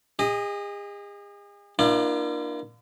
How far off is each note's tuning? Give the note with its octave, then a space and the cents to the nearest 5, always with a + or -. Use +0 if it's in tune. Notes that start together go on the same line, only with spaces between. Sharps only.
G#4 -40 D#5 +0
A#3 +25 D4 +35 F4 -45